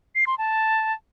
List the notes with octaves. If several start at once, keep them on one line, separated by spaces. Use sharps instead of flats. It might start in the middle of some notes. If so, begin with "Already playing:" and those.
C7
C6
A5